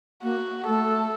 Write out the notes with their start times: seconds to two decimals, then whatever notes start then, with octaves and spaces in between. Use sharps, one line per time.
0.23 A#3 F#4
0.67 A3 A4